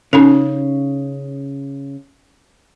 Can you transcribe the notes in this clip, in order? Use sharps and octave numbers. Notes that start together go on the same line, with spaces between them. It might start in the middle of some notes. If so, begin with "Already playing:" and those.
C#3 C#4 D#4 A4